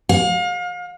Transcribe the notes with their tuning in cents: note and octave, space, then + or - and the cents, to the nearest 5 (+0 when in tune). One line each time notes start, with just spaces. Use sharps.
F5 +35